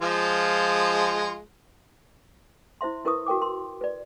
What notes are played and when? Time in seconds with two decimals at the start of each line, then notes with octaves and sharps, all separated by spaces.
0.02 F3 G#3 F4
2.81 E4 C5 E5 C6
3.05 E4 A#4 B4 E5 C#6 D#6
3.26 F#4 A#4 G5 D6
3.41 A#4 C6
3.81 B4 D5